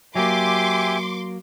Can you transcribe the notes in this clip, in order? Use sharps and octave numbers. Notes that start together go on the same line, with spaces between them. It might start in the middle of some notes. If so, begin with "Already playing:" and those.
F#3 A#3 G4 E5 G#5 C6 D6